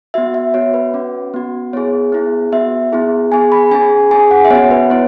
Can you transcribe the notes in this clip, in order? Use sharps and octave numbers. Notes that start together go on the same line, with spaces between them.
B3 F#4 E5
E5
B3 F#4 C#5
B4
C#4 F#4
B3 F#4
B3 E4 G#4 C#5
B3 E4 G#4
B3 F#4 E5
B3 E4 G#4
B3 G#4 G#5
B5
C#4 G#4 G#5
C#4 G#4 G#5
F#5
E5
B3 F#4 C#5
B4
B3 E4 C#5